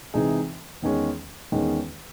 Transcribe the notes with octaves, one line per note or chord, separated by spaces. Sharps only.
C3 E3 G#3 D#4 G#4
E2 D#3 G#3 C#4
E2 D#3 G#3 C#4